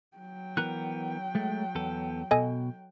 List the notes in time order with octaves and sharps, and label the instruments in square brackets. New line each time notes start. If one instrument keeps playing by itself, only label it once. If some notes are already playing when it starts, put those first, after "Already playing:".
[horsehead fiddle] F#3 G5
[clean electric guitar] E3 B3 A#4 [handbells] F#6
[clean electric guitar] G#3 A3
E2 B3 A4
[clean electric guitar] B2 [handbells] A4 D#5 G#5